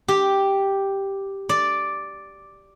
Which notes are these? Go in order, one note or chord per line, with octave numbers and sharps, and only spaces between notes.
G4
D5